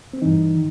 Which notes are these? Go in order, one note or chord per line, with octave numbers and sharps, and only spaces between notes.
C4
G2 E3 D#4
D#3